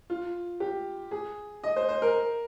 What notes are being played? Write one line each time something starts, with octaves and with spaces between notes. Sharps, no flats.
F4
G4
G#4
D#5
C5
C5
A#4